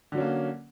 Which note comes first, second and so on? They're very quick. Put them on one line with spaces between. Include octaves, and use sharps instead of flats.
D3 F#3 C#4 A#3